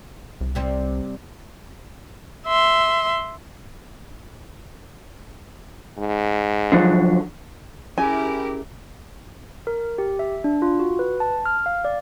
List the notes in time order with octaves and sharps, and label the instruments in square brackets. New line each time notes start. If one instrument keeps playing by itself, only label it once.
[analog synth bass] C2
[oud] C3 G3 C4
[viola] E5 C6
[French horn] G#2
[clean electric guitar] D3 F3 F#3
[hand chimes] C#4 G#4 [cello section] E4 G4 A#4 [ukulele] G#5
[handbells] A#4
G4
E5
D4
F4
F#4
B4
A5
F6
F5
D5